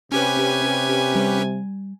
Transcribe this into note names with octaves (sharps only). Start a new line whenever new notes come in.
C3 C#4 G4 B4 G#5
G3